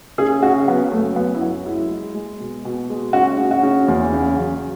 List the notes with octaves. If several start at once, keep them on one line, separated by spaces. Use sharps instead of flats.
C#3 G#4
C#3 F#4
F#3 B3
F#2 A3
F#2 B3
E4
F#3 F#4
G#3 E4
G#3
G#3
B2
B2
G#3
C#3 F#4
C#3
F#4
C#3
E2
C#3
F#3